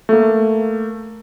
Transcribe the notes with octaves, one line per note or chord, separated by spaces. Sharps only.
A3 A#3